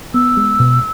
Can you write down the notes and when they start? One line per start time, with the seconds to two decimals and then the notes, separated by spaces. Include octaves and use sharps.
0.14 B3 E6
0.37 G#3
0.60 B2